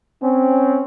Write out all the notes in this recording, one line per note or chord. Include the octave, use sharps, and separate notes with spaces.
C4 C#4